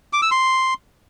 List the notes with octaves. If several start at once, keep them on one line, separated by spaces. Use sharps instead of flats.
D6
E6
C6